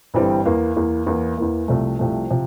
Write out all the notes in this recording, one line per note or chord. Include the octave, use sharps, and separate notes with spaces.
G1 G2 E3 G3 C4
E2 E3 A#3
E2 E3 A#3
E2 E3 A#3
E2 E3 A#3
C2 C3 F3 A3
C2 C3 F3 A3
C3 F3